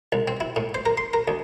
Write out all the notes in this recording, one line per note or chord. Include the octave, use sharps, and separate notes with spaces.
C2
C4
E4
A2
C5
A#4
C6
A#4
D2